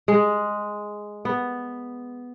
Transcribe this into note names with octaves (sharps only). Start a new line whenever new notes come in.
G#3
B3